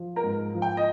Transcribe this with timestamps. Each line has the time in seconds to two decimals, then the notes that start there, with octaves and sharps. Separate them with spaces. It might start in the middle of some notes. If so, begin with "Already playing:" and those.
Already playing: F3
0.16 A#4
0.23 G#2
0.55 F3
0.62 G5
0.77 D#5